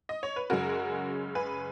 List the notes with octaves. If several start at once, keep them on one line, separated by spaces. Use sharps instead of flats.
D#5
C#5
B4
F#2 C#3 G#3 C#4 F#4 A#4
G#4 B4